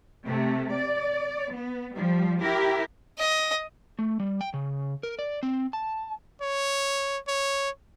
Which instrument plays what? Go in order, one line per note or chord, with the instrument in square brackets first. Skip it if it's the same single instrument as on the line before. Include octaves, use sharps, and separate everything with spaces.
[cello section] C3 A3
D5
B3
F3 G3
E4 G4 A#4
[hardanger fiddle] D#5
[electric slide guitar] A3
G3
G5
C#3
A#4
D5
C4
A5
[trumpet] C#5
C#5